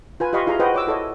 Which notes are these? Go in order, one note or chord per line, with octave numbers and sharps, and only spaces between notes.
F4 B4 G#5
F4 G4 D#5 F5 B5 C#6
E4 F4 G#4 E5 A#5 C6
F#4 B4 C5 D#5 F#5 G5
C#5 D6 E6
E4 A4 C#5 D#5